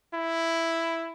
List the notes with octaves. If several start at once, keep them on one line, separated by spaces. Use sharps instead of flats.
E4